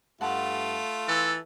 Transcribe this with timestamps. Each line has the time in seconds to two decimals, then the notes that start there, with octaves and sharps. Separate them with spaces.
0.21 G2 A3 F4 F#5 A5
1.08 E3 A4